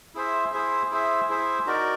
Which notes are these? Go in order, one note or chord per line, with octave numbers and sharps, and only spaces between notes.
E4 G#4 C5 E5
E4 G#4 C5 E5
E4 G#4 C5 E5
E4 G#4 C5 E5
D#4 F#4 A#4 D5